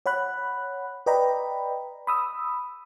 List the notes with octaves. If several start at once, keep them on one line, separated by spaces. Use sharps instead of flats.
C#5 F#5 B5 F#6
B4 D5 D#5 G5 A#5 B5
B5 D#6 E6